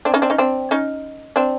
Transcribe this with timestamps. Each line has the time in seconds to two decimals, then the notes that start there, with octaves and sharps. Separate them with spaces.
0.05 C4 D4
0.14 C#4 D#4
0.22 C4 D4
0.30 C#4 D#4
0.38 C4 D4
0.71 C#4 D#4
1.36 C4 D4